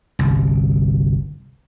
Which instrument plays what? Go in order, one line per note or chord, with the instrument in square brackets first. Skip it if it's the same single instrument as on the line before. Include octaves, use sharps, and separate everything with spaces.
[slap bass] G1 C2